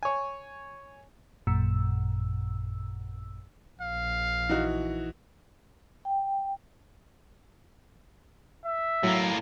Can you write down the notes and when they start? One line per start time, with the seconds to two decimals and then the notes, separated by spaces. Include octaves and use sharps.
0.03 C#5 G#5
1.47 A1 F#2 A#2 E6
3.81 A#1 F5
4.49 E3 D#4 F#4
6.05 G5
8.65 E5
9.03 A2 F#3 A#3